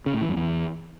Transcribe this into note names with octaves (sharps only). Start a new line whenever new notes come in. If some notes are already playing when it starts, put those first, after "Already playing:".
C#3
A2
E3
F#2
E2